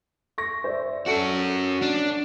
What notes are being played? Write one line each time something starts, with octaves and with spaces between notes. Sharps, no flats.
C#6 A#6
C5 D5 E5
C#4 F#4 A4 C#7
D4 D#7